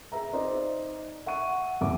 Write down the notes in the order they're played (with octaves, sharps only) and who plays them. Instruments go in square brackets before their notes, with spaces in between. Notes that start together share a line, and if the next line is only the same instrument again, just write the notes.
[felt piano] G#4 B4 E5 A#5
D#4 C5 D5
E5 F#5 C#6 D#7
A1 E2 B3 E5 D6